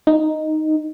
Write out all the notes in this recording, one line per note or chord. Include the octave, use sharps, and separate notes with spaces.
D#4